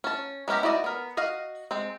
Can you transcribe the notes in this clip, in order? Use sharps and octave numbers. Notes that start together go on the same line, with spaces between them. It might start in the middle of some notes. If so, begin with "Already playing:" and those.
C#4 A5
G#3 B3 C#4 G4 A#5
E4 F#4 D5 D#5
B3 A#4
F#4 D#5 F5
G#3 C4